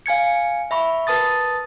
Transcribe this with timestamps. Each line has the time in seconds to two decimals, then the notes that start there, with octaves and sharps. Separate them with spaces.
0.06 F5 G#5 G#6 C#7
0.71 E5 B5 C#6
1.07 A#4 B4 A5 D#6 A6